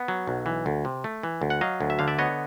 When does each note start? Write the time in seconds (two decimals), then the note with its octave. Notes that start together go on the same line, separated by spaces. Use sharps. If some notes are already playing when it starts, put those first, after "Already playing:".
Already playing: B3
0.08 F#3
0.28 B1
0.46 E3
0.66 D2
0.85 C3
1.04 A3
1.23 E3
1.42 D2
1.50 F#5
1.61 F#3 D#5 F5
1.81 D2
1.90 E5
1.99 D3 F5
2.08 D5 E5
2.19 B3 C#5 D#5